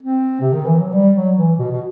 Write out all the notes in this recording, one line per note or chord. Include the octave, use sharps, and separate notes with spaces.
C4
C3
D#3
E3
F#3
G3
F#3
E3
B2
B2